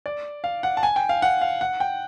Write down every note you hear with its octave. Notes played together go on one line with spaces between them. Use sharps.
D5
F5
F#5
A5
G#5
G5
F5
F#5
F5
F#5
G5